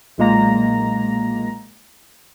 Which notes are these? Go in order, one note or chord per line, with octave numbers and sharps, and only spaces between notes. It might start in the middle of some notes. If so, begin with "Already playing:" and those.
B1 A#2 G#3 A#3 A#5 A#6